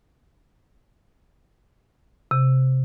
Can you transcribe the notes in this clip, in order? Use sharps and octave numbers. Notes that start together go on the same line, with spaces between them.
C3